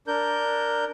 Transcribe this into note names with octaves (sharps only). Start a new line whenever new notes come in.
D4 A#4 G6